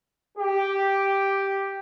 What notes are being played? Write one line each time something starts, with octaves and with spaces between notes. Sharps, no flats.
G4